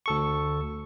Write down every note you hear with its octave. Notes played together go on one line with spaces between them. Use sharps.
D2 A4 C#6